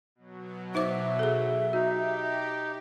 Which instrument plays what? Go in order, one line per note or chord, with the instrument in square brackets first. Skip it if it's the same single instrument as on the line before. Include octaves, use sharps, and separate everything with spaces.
[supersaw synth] B2 F#3
[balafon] D#4 C5 D6 [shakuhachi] E5
[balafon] G#4 A4
[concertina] D#4 [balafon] F#4 [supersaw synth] G4